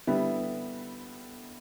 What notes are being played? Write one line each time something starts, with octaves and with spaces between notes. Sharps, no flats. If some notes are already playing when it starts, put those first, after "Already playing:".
D3 G3 B3 E4